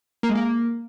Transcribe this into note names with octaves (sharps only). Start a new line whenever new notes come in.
A#3
G#3
A#3